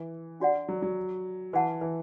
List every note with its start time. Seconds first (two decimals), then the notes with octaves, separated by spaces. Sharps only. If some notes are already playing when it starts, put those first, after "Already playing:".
Already playing: E3
0.40 D4 F#4 D5 F#5
0.69 F#3
0.82 F#3
1.53 E3 F#4 B4 F#5 A5
1.81 E3